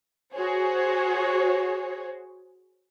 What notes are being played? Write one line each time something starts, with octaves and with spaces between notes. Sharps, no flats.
F#4 G#4 C5 C#5